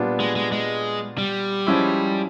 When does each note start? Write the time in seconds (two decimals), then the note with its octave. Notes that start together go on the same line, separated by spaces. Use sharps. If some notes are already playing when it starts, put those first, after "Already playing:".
Already playing: A#2 G3 B3 D4 F4
0.20 G#3
0.36 G#3
0.52 G#3
1.18 G3
1.67 F3 G#3 C#4 E4